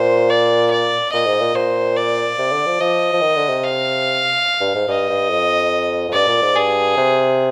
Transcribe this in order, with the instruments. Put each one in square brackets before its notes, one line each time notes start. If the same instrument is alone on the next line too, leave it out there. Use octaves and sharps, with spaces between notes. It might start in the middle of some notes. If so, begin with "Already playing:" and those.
Already playing: [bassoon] A#2 [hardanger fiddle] C5
[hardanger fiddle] D5
D5
[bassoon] A#2 [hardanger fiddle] D#5
[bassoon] G#2
A#2
[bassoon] A#2 [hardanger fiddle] C5
[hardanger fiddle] D5
[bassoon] C3
D3
F3
[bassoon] F3 [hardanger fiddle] D#5
[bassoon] F3
D#3
D3
C3
[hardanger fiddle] F5
[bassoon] G2
G#2
[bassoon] G2 [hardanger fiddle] D#5
[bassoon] G2
F2
F2
[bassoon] G2 [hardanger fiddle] D5
[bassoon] A#2
G#2
[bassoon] G2 [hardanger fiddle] G#4
[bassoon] C3